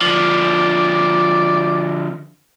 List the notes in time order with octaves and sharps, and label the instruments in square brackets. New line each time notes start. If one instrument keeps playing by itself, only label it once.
[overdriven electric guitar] D3 F3 [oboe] D5